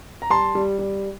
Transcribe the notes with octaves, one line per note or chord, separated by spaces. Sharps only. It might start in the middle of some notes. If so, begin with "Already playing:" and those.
A#5
G3 A5 C6
G3
G3